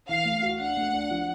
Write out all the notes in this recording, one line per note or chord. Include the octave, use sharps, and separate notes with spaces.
E3 F5
A3
F#4
D4 F#5
A3
D4
F3